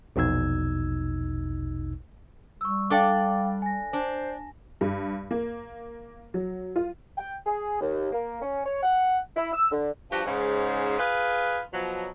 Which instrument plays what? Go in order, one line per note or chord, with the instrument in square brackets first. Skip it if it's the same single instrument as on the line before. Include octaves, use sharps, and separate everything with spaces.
[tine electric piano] A#1 E2 B2 D#4 E6 G#6
[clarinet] G3 [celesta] C#6 E6
[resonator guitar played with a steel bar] D4 A4 D5 [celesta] F5 G5 D6
[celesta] G#5 A#6
[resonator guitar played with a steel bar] D4 [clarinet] C5
[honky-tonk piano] G2
A#3
F#3
F4
[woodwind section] G5
G#4
D#2
A#3
C#4
C#5
F#5
E4
E6
D3
[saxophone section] G2 F3 F#4 G4
G#2 C#3
F4 G#4 B4
B2 F3 F#3